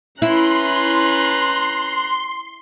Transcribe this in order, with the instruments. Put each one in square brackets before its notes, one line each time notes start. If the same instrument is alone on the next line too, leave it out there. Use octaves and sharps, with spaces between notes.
[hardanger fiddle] C#4 B4 [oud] E4 [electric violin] A#5 F#6 [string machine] C6